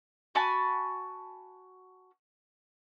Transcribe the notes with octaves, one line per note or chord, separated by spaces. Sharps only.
F#4 G#5 A5 B5